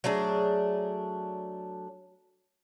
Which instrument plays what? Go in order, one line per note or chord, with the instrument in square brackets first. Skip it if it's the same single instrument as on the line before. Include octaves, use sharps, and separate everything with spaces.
[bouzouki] F#3 A3 D4 G#4